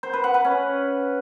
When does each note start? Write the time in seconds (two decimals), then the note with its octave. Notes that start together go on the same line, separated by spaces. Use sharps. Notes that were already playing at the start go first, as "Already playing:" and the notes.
0.03 C5
0.13 B4
0.24 F#5
0.34 B4
0.45 C#4